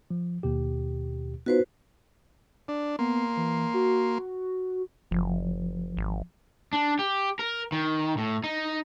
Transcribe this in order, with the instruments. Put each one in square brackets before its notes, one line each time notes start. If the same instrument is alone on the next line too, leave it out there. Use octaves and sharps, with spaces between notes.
[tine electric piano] F3
D#2 B2 G4
[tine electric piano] B3 D#4 F4 [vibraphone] F#4 B4 C5
[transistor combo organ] D4
[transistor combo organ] A#3 C6 [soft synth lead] B3
[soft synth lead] E3
F#4
[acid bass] F#1 [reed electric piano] F3
[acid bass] G#1
[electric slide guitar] D4
G4
A#4
D#3
A2
D#4